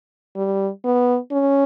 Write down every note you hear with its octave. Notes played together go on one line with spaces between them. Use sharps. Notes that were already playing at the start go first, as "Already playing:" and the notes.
G3
B3
C#4